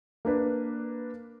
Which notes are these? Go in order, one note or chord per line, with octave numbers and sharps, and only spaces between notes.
A#3 D4 B4